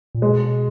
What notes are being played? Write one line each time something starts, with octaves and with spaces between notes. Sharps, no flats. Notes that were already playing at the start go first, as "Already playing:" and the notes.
A#2
B2 G#3